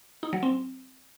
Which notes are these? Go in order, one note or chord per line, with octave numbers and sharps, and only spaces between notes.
D#4
F#3
C4